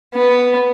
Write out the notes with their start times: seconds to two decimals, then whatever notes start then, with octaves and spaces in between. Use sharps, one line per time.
0.14 B3